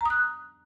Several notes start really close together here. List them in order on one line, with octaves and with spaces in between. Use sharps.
A#5 D#6 F#6